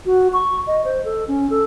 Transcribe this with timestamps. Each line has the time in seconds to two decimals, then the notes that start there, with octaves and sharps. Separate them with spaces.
0.06 F#4
0.33 C#6
0.67 D#5
0.85 C5
1.05 A4
1.28 C#4
1.50 A4